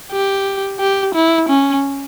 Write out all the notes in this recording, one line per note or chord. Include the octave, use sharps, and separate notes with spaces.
G4
G4
E4
C#4